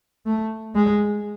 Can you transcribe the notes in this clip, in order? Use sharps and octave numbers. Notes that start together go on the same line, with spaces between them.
A3
G#3